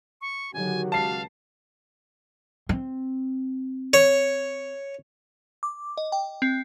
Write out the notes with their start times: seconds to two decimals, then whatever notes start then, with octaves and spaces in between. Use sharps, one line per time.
0.21 C#6
0.54 D3 D#3 F#3 F#4 G4 G#5
0.92 C#2 F5 A5 C7
2.69 C4
3.93 C#5
5.63 D6
5.97 D#5
6.12 G5
6.42 C4